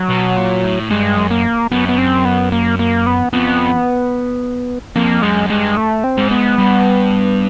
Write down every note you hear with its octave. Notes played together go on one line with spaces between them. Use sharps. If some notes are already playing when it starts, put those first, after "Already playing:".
Already playing: F#3
B2
A#2
A2
G2 G#3
F#2
A#3
F#2 B3
B3
C4
B3
A#3
A#3
B3
F2 B3
F2 A#3
F#2 G#3
G2 G#3
A3
C4
G#2
B3
G2